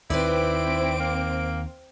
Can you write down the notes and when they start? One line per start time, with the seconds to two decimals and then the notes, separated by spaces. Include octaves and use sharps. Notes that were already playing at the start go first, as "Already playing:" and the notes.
0.10 D#2 D#3 C4 E4 B4 C5 D5 D7
1.00 A#3